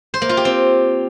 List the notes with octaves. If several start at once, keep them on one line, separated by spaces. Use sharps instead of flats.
C5
A#3
F4
G4
C4